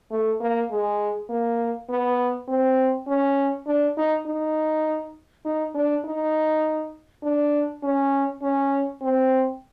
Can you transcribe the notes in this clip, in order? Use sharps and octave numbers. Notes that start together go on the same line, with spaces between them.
A3
A#3
G#3
A#3
B3
C4
C#4
D4
D#4
D#4
D#4
D4
D#4
D4
C#4
C#4
C4